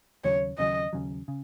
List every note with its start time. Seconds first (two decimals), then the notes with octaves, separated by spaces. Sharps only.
0.24 D#2 C#3 F#3 C#5
0.58 D#2 C#3 F#3 D#5
0.93 D#2 C#3 F#3
1.28 C#3